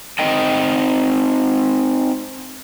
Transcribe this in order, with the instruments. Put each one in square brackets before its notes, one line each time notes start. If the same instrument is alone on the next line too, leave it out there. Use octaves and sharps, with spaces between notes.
[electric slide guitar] C4 D#4 D#5 G5